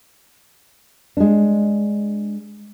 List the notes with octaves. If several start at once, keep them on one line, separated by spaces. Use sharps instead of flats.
G#3 D4